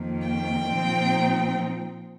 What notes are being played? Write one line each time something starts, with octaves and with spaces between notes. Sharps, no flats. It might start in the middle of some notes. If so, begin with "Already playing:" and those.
Already playing: F2 D#3 A#3
G5
A#2 F3 C4 D#4